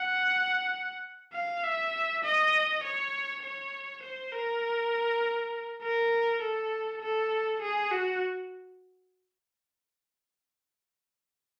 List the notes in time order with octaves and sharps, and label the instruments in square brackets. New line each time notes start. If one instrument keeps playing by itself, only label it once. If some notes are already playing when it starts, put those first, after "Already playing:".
Already playing: [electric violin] F#5
F5
E5
D#5
C#5
C#5
C5
A#4
A#4
A4
A4
G#4
F#4